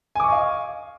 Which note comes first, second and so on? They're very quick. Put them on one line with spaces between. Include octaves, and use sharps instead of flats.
G#5 D6 C#6 D#5 F5